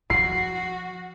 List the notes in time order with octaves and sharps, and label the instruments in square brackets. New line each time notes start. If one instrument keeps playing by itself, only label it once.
[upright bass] F3 [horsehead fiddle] F#4 [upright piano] C7